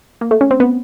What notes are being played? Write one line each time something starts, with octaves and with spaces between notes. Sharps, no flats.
A#3
A3
C#4
C4
B3